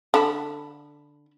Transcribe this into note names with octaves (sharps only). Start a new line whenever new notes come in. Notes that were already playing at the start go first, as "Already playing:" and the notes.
D3 A5 B5